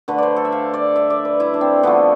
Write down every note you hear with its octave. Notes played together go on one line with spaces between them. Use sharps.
D3 A3 B4
C5 D5
A4
E5
F5
D5
E5
D5
B4
E4
D4
C4
D3 F3 A3 B3